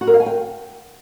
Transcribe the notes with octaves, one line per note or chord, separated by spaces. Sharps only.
F#4
A#4
F5
G#5
G5